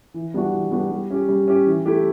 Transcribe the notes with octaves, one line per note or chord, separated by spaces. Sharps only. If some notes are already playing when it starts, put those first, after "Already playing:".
E3
G3 B3 D4 F#4
E3
G3 B3 D4 F#4
G3
C#4 G4
G3
C#4 G4
E3
A3 E4 G4